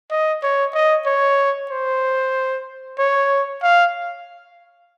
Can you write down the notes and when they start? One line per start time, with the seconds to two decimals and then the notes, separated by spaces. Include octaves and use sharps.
0.11 D#5
0.43 C#5
0.74 D#5
1.06 C#5
1.70 C5
2.98 C#5
3.62 F5